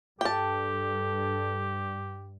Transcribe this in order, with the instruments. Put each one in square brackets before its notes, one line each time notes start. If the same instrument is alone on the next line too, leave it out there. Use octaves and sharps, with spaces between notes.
[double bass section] G2 [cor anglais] G4 [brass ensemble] A4 [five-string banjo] G5 A5